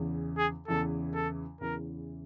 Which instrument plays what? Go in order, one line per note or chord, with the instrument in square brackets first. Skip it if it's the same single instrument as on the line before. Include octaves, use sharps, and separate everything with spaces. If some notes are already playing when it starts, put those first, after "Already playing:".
Already playing: [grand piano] E2 C#3 E3
[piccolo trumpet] G#4
[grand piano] E2 C#3 E3 [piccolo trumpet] A4
[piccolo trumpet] A4
[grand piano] E2 C#3 E3 [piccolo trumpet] A#4